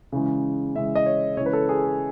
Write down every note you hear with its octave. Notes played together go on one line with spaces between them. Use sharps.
C#3 E3 G#3
C#3 E3 G#3 E5
D#5
C#5
C#3 E3 G#3 C#5
B4
A4
G#4
A4